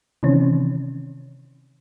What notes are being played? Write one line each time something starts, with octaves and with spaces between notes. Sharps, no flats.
C3 D#3 E3 C4 C#4